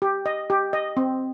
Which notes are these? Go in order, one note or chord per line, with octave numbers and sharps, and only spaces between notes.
G4
D#5
G4
D#5
C4